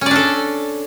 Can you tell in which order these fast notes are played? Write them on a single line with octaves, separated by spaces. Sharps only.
C#4 D5 D4 A4